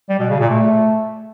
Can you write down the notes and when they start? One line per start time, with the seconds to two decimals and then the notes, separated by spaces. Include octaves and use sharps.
0.09 G3
0.19 B2
0.30 C#3
0.40 A#2
0.50 A3